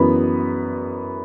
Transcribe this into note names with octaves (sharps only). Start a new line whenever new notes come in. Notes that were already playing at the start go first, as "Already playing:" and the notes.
Already playing: F#2 E3 B3 B5